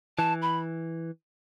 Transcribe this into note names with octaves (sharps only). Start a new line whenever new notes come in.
E3 A5
B5